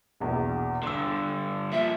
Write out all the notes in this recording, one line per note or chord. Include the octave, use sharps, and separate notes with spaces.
A#1 E2 B2
G2 D3 C6 E6
A#2 F3 E5